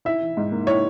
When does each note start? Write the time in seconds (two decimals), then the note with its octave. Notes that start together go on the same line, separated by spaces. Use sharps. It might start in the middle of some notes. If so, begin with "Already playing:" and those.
0.05 E4 E5
0.21 E3
0.37 G#2
0.52 A#3
0.67 E4 C#5